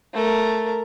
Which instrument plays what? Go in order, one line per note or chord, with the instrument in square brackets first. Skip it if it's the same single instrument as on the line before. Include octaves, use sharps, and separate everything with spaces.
[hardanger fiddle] A3 A#4